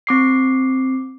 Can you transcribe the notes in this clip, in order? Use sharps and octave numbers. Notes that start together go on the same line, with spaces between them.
C4 D6 C7